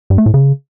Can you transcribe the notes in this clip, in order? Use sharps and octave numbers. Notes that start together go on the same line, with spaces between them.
G2
A3
A2
C#3